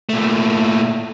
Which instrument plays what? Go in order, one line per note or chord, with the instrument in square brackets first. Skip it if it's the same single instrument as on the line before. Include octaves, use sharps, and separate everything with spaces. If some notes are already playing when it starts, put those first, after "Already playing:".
[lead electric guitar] A#2 A3